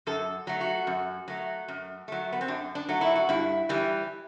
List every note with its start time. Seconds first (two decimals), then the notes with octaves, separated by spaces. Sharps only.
0.07 F#2 A4
0.47 F#3 A3
0.61 F#4
0.87 F#2
1.28 F#3 A3
1.68 F#2
2.08 F#3 A3
2.33 B3
2.41 C4
2.48 F#2 D4
2.75 D4
2.89 F#3 A3
3.01 E4
3.15 F#4
3.29 G2 E4
3.69 E3 G3